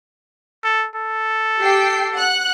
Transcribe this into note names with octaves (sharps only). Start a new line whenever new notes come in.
A4
A4
G4 G5 C7
F#5 F#6